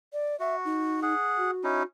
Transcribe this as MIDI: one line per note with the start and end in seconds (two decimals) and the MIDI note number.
0.13 0.38 74
0.40 1.00 66
0.40 0.56 76
0.65 1.14 63
1.03 1.51 68
1.03 1.51 78
1.38 1.84 66
1.64 1.83 61
1.64 1.83 63
1.64 1.83 64